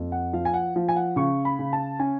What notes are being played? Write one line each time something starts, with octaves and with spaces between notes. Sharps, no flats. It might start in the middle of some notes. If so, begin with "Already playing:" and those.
Already playing: F2
F#5
F3 F5
G#5
F#5
F3
G#5
F#5
C#3 C#6
B5
C#3
A5
C#4 G#5